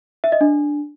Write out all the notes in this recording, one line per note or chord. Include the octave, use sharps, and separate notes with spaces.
E5
D#5
D4